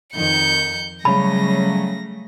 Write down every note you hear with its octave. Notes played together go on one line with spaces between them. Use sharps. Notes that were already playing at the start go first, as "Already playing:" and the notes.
F2 D#3 G6 C#7
C#3 F#3 G3 A3 B5 A#6